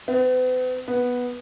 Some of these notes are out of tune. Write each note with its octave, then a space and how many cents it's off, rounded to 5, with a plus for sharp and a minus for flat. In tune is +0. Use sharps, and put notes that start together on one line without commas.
B3 +45
B3 -5